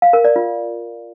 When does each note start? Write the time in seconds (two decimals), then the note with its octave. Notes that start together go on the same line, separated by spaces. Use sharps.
0.02 F5
0.13 A#4
0.25 D5
0.36 F4